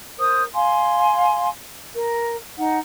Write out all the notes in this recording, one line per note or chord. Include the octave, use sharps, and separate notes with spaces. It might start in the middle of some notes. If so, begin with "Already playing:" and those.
A#4 C5 D#6
F5 G#5 C6
A#4
D#4 F#5